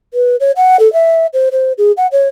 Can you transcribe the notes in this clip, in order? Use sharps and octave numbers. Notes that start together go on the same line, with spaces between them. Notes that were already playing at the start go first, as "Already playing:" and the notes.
B4
C#5
F#5
A4
E5
C5
C5
G#4
F#5
C#5